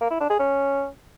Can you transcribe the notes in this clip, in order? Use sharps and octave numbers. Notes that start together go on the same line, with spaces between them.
A#3
E4
D4
G#4
C#4